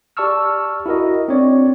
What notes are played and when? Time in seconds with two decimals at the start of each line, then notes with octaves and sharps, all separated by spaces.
0.17 G4 D5 A5 C#6 E6 F6
0.86 E4 F#4 A#4 D#5
1.28 C4 D4 C#5 D5